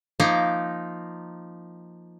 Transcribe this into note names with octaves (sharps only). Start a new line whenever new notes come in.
F3 A#3 D#4